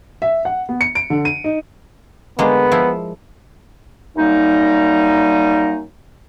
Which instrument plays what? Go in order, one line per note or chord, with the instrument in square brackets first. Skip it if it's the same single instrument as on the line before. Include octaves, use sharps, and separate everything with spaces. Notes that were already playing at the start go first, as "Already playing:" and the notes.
[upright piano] E5
F#5
B3
C#7
D7
D3
D#7
D#4
[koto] D3 G#3 A#3 [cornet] B3
[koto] F3 E4 E5
[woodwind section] F#2 G3 A#3 D#4